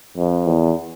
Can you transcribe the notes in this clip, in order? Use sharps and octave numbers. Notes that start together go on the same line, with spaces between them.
F2
E2